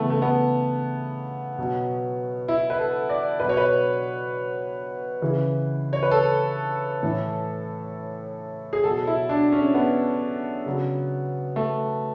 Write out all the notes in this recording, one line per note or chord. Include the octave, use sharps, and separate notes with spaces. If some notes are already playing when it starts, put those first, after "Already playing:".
Already playing: C#3 E3 A3 B3
A3
B3
B2 F#3
E4
B4
A4
D5
B2 F#3 B4
C#5
B4
C#3 E3
C#5
B4
A4
A2 E3
G#4
B2 F#3 A4
E4
D4
C#4
B3
C#3 F#3
A3